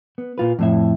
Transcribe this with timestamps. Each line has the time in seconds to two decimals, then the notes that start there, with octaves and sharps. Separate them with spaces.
0.18 B3
0.38 A#2 F4 B4
0.59 F2 A2 E5